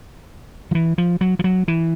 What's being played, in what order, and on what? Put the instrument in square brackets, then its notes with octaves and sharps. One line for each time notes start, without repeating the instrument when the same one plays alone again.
[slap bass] F3
E3
F3
F#3
F3
F#3
E3